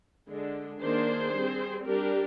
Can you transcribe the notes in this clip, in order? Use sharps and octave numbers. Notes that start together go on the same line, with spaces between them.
D3 G#3 D4
D#3 A#3 D4 G#4 C5
G3 C4
G3 D4 G4 A#4